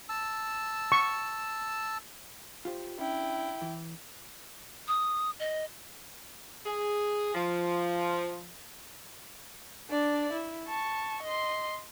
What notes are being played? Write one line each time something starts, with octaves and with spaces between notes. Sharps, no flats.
A5 E6
C#6
F4 G4 C5
C#4 D4 E4 G5
E3
D#6
D#5
G#4
F3
D4 D5
E4
A5 C#6
D#5 C6